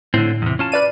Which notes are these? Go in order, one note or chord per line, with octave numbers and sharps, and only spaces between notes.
A2 D3 A3 C4
E2 C3
C#4 F4 A5
B4 D5 D#7